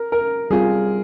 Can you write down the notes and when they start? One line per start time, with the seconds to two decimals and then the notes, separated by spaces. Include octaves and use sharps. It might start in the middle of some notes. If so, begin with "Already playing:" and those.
Already playing: A#4
0.12 A#4
0.51 G3 C4 F4 G#4